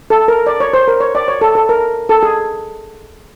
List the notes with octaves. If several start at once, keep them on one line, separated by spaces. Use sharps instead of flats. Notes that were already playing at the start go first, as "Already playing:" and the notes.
A4
A#4
D5
C#5
C5
A#4
C#5
D5
C#5
A4
A4
A#4
A4
G#4